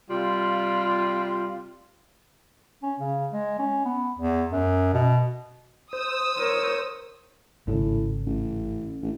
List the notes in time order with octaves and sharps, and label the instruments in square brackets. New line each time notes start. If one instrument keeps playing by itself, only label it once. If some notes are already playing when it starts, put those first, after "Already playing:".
[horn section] C3 G3 F4
[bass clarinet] C#4
C#3
G#3
C#4
B3
E2
F#2
B2
[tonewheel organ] C5 [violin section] D#6 E6
[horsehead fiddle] A#4 C#5
[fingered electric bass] G#1 C#3 [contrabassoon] A2
[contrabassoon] A1
A1